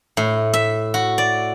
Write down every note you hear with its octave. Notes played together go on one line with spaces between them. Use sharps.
A2
E5
F#4
D5